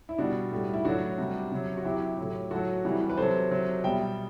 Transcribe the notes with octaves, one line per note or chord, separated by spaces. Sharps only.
E4
B2 G3 D4 F#4
A2 G3
E4
A2 F#3 D4 F#4
C3 G3
C3 F#3
F#4
C3 F#3 E4 G4
A2 F#3
A2 F#3 F#4 A4
C3 E3 G3
B4
C3 F#3 A4 C5
C3 F#3
B2 G3 E5 G5